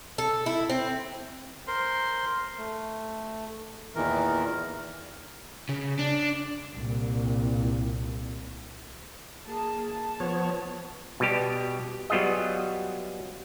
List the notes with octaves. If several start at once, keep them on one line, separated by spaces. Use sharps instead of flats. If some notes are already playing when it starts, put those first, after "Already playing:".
A4
E4
C4
A#4 C5 C6
A3
E2 A#2 D#3 E3 A#4
C#3
D4
C2 A#2
A#3 G#4 A5
A5
F3 B3 C#5
B2 G3 G4
F#3 G3 B3 F4 G#4 D#5